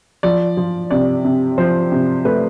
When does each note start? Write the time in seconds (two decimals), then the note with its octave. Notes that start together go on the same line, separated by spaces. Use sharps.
0.23 F3 D5
0.57 F3
0.91 C3 D5
1.24 C3
1.58 F3 C5
1.92 C3
2.25 A3 B4